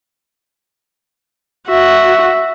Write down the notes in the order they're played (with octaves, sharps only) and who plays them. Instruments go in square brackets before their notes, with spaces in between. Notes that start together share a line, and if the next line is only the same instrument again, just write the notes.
[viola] F#4 [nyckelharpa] E5